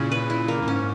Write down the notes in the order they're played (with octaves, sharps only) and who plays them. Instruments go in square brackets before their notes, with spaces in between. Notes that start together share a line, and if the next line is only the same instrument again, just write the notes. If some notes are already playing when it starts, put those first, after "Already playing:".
Already playing: [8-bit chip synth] A#2 C#3 [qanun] C#4 E4
[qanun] B4
E4
A#3
[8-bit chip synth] F#2
[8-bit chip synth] G#2 [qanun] C#4